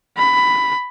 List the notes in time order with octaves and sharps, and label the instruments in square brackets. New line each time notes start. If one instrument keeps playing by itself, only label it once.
[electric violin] B5